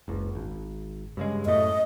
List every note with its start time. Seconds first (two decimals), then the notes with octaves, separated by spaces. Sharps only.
0.08 F#1 C#2
0.35 G#1
1.17 G2 C#3 G#3
1.46 F#2 A2 A3 D#5